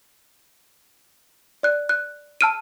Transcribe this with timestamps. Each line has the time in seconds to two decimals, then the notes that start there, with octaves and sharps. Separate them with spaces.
1.63 D5 F#6
1.89 F#6
2.41 A5 E6 F6 D7 D#7